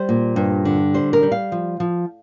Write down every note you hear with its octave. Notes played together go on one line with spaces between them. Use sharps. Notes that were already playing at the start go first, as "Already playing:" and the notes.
Already playing: G3 C5
A#2
G2
D3
G3 C5
A#4
G3
F5
F3
F3